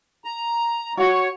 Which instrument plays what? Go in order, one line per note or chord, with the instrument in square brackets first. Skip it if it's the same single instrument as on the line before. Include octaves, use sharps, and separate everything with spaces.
[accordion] A#5
[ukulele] F#4 [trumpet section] C#5